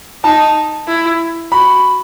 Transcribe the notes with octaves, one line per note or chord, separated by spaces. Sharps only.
D#4 A5
E4
F#4 B5